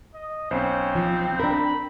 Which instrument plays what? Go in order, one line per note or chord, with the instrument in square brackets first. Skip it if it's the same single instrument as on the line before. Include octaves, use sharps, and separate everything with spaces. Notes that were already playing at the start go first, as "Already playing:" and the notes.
[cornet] D#5
[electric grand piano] B1 C5 [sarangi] C4 [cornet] C#4
[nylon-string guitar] F3
[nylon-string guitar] D4 A#4 [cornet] B5